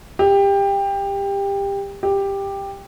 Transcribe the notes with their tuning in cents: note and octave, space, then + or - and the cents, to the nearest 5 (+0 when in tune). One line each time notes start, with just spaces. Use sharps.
G4 +20
G4 +10